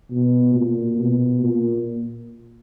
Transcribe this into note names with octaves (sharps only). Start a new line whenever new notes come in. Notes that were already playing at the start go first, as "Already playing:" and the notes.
B2
A#2
B2
A#2